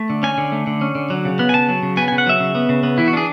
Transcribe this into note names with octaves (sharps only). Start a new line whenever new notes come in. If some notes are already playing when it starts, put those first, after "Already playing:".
Already playing: A3
D3
C#4 G#5
D3
A3
D3
C#4
D3
F#3
C#3
B3
G#5
C#3 A5
F#3
C#3
B3 G#5
C#3 G#5
F#5
F#3 E5
C#3
B3
C#3
B3
E3 E4
F#4
D4 G#4